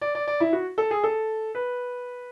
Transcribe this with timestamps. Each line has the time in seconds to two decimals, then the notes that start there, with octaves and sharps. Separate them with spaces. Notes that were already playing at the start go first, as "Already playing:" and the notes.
0.01 D5
0.15 D5
0.27 D5
0.40 E4
0.53 F#4
0.78 A4
0.91 G#4
1.03 A4
1.55 B4